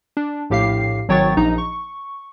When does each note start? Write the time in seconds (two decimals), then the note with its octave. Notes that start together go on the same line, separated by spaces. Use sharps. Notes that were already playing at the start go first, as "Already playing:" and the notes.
0.17 D4
0.50 A#1 A2 G4 F5 C7
1.09 G#1 F#3 C#5 G5 C#6 A6
1.37 A#1 D#4 A#5
1.58 C#6